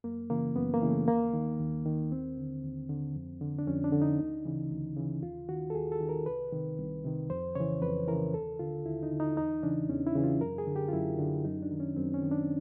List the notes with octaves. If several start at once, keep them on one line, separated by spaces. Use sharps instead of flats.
F#2 A#3
C#3 E3 A#3
F#2 B3
A#3
C#3 E3
A3
D#2 A#3
D#3
D#2
D#3
D#2 C4
D3
D#2
D3
F2
D3
D4
F2 C#4
D4
D3
D#4
D2
C#3 E3
D2
C#3 E3
D#2 F4
D#3 F#4
A4
D#2 G#4
A4
D#3
A#4
C2 B4
C3 D#3
C2
C3 D#3
F2 C5
C#3 E3 C#5
F2 B4
C#3 E3 A#4
D#2 A4
D3 F4
D#2 E4
D#4
D3
D#4
E2 D#4
C#3 E3 D4
E2 C#4
E4
C#3 E3
F4
F#2 A#4
G#4
D3
G4
F4
F#2 E4
D3
F#2 D#4
D4
D#3
C#4
F#2 C4
C#4
D#3
D4